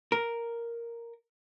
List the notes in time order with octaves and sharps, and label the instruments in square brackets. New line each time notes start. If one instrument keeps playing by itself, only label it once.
[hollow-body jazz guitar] A#4